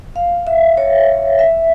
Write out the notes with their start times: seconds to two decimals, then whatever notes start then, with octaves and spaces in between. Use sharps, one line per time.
0.16 F5
0.47 E5
0.77 C#5
1.39 E5